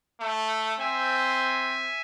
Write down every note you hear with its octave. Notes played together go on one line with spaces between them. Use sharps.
A3
C4 E5 G#5